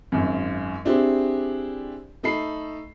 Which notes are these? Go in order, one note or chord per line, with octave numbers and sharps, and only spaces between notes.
G#1 F#2
C4 D4 E4 G4 G#4 C5
A3 D#4 A4 B5 C7